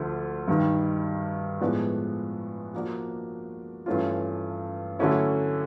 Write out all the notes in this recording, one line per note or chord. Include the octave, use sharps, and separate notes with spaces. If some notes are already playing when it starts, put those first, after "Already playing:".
Already playing: D2 D3 F3 A3
G2 D#3 G3
A2 F3 G#3 B3 D4
F3 A#3 D4 F#4
G2 E3 A3 C#4 F4
D3 F#3 A3 C#4 E4